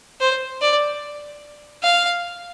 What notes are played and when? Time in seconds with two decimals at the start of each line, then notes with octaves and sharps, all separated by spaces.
0.20 C5
0.61 D5
1.83 F5